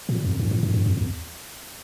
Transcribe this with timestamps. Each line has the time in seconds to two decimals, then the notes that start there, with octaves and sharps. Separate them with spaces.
0.09 A#2
0.24 F2
0.39 G2
0.51 A2
0.63 G2
0.74 G2
0.86 F2
0.97 E2